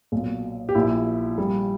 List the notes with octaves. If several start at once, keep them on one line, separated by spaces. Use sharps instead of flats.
B1 A#2
G4
A#1 A#2 E4
A#1 A#2 G3